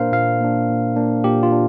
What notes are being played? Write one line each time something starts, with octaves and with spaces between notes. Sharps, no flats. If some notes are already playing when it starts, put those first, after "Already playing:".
Already playing: A#2 A#3 D4 A#4 C5 F5
A#2 F5
A#3 D4
A#2
A#3 D4
A#2 G4
F4
D4